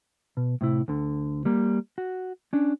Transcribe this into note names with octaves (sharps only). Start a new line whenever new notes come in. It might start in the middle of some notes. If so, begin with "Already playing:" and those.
B2
A2 C3 E4
D2 D3
G3 A#3
F#4
C#4 D4